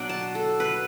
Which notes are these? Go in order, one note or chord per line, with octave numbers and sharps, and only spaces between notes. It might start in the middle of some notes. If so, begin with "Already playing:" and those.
Already playing: B2 F#3 D4 B5 D6
A5
A4
B4